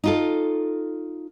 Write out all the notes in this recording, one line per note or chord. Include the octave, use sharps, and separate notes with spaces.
D#4 F4 A4